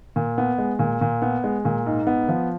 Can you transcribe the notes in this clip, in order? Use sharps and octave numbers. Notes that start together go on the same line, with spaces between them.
A#2
B3
G#3
A#2
A#2
B3
G#3
A#2
G#2
B3
F3